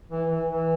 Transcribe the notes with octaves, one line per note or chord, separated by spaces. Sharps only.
E3
E3
E3